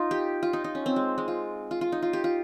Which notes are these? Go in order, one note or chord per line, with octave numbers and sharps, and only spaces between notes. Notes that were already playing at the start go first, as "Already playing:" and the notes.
Already playing: D#4 F4
G4
F4
D#4
D#4
C#4
C4
G#3
G#3
F4
F4
F4
D#4
F4
G4
F4